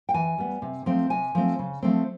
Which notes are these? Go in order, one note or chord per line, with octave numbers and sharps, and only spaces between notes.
G5
E3 G#5
G3 B3
C3
F3 A3 C4
C3 G#5
F3 A3 C4
C#3
F3 A3 C4